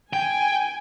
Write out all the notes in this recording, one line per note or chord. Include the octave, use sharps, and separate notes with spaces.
G5 G#5